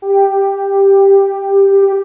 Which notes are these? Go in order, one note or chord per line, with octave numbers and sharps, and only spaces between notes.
G4
G4